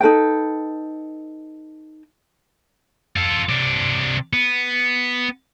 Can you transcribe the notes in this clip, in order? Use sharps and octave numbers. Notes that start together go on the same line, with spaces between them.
D#4 A4 B4 G5
F4 A4
C3 D4
B3